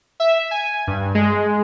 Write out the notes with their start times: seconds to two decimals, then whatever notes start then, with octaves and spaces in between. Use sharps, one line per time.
0.20 E5
0.51 G#5
0.87 G2
1.15 G#3